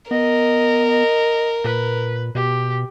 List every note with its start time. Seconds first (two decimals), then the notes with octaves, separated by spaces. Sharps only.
0.11 B3 A#4 D#5
0.90 D#5
1.64 A#2 B4
2.35 B2 G4